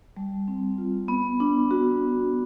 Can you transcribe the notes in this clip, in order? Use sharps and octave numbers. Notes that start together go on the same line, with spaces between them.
G3
C4
F4
B3
D4
F#4